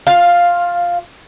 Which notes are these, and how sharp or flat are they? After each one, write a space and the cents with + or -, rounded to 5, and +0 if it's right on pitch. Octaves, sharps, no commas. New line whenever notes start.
F4 +15 F5 +0